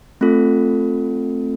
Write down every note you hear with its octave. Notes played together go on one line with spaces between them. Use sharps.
A3 C4 F4 A4